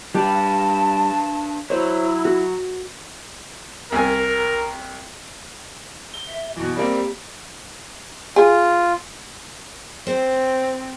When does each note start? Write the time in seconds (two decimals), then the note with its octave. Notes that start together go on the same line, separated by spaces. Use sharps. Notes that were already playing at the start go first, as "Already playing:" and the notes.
0.15 G3 D4 G4 B4 A5
1.70 F#3 E4 C5 C#5
2.25 F#4
3.92 C2 A#4 G#5
6.14 G7
6.28 E5
6.56 B2 E3 F#4
6.76 G3 A#3 C4 G4
8.36 F4 G#4
10.07 C4 C5